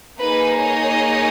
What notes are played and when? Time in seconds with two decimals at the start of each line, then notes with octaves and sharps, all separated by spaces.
0.21 A#3 D#4 G#4 B4
0.60 C#5 D#5